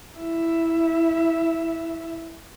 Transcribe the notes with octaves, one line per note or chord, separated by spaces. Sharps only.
E4 E5